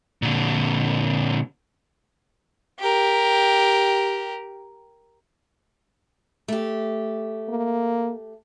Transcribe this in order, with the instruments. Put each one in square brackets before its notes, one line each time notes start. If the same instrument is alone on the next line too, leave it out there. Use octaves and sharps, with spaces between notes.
[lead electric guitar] A#2 D3
[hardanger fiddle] G4 A#4
[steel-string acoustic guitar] A3 G4
[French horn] A#3